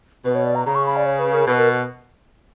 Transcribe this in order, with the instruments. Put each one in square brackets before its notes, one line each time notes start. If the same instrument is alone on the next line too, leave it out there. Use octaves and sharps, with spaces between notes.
[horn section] B2 [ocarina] B4
[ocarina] C#5
D5
A#5
[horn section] C#3 [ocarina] A#5
[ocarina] C#6
B5
D5
C#5
B4
A#4
[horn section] B2 [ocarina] B4
[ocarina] A#4